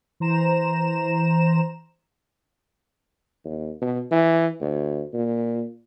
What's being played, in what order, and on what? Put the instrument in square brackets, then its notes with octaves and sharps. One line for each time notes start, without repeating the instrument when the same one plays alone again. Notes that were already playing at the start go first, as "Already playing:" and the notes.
[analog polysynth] E3 C5 A#5 E7
[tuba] D#2
B2
E3
D2
A#2